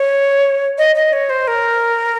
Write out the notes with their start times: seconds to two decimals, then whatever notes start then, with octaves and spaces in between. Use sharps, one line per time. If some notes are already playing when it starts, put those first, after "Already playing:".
Already playing: C#5
0.78 D#5
0.96 D#5
1.13 C#5
1.30 C5
1.48 A#4